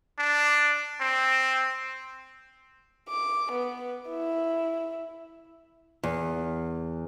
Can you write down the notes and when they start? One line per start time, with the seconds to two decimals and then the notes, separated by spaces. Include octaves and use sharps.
0.19 D4
1.01 C4
3.09 D6
3.52 B3
4.09 E4
6.03 E2